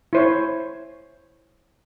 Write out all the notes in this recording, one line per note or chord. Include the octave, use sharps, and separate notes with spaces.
E4 C5 C#5